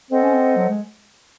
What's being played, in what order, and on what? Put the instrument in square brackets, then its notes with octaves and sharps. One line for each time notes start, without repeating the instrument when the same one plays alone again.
[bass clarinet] C4 [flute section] A4 C5 D#5 F#5
[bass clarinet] C#4
C4
F#3
G#3